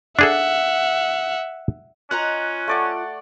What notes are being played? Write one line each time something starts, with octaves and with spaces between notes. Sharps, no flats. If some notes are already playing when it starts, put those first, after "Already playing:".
D4 G#4 A4 E5 F#5
C#4 F4 D#5 A#5 F#6
A3 D5 F#5